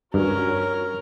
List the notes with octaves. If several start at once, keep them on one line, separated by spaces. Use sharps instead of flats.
G2 C#4 F#4 A#4